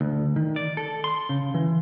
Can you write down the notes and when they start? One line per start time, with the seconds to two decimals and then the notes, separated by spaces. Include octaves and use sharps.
0.01 D2
0.36 D#3
0.56 D5
0.77 A4
1.04 C6
1.29 C#3
1.54 E3